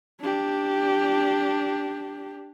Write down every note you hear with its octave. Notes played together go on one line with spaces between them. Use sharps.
D4 G4